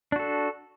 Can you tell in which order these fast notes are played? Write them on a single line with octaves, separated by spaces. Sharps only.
D4 F#4 A4